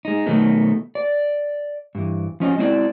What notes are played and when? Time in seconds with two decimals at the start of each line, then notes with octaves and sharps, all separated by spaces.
0.05 G#3 D#4
0.26 B2 D#3 F#3 A3 B3
0.95 D5
1.95 G2 E3
2.40 F3 C#4 D#5
2.58 G#3 C4 E4 C5 D5